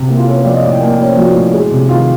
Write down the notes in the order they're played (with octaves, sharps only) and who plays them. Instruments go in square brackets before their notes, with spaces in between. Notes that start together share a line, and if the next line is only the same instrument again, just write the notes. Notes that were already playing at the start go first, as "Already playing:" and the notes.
Already playing: [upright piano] C3
A#3 E4
F4
C#4 A4
B4
F3 D5
D#5
A2 D5
G5
A#3 G#5
G5
C#4
C5
F3 F#4
A2
G#3
C3
D#3 F4